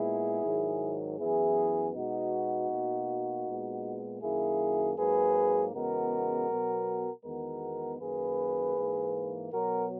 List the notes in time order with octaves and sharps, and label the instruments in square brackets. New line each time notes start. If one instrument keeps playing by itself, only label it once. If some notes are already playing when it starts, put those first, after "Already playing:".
Already playing: [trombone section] A#2 G#3 B3 E4 G#4
G#2 D#3 F#3
F#2 E3 B3 E4 G#4
B2 G#3 B3 D#4 F#4
B2 A#3
A#2 G#3 B3
F#2 D#3 A#3 E4 G#4
G#2 F#3 A#3 G#4 B4
E2 C#3 G#3 B3 F#4 A#4
B2 F#3 B3
E2 D#3 G#3 B3 F#4 A#4
F#2 D#3 A#3 G#4 B4
G#2 E3 A#3
B2 F#3 B3 F#4 A#4